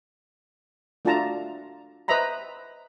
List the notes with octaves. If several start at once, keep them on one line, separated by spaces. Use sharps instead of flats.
A3 D4 F4 F#4 A5 A#5
B4 C5 D#5 E5 A#5 B5